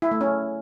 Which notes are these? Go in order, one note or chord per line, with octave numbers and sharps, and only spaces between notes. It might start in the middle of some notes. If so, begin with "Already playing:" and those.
E4
A3
C#4